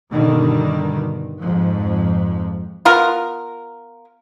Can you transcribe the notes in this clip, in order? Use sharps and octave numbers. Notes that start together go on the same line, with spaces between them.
G2 B2 D3 D#3 G3
F2 G#2 F3
B3 F4 A#4